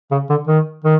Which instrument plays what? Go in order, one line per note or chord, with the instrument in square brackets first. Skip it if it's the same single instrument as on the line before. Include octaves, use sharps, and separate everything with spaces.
[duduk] C#3
D3
D#3
D#3